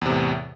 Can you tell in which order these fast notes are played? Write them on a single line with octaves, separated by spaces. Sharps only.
E2 C3 A2